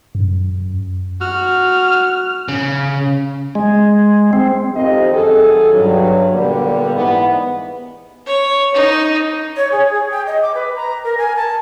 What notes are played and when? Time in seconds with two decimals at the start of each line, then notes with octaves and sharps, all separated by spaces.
0.15 F#2
1.21 F#4 F6
2.48 C#3
3.55 G#3
4.33 C4
4.74 F2 D#3 C4 G4 D#5
5.12 F#2 D#3 G#4 A4
5.72 G2 F#3
6.31 A#2 D3 G3 A#3 B3
6.94 G#2 E3 B3
8.26 C#5
8.74 D#4
9.57 C#5
9.72 G#4
9.93 G#4
10.11 G5
10.26 D#5
10.42 D6
10.55 B4
10.76 A#5
11.04 A#4
11.18 G#5
11.36 A5